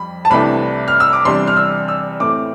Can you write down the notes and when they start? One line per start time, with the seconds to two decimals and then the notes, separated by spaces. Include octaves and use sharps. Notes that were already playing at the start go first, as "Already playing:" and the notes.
Already playing: F2 G3 B5
0.25 A5
0.30 C2 C3 E3 A3 D4 B5
0.88 F6
1.00 E6
1.13 D6
1.25 E2 C3 G3 D4 C6
1.47 F6
1.57 E6
1.88 E6
2.20 A2 E3 A3 C4 D6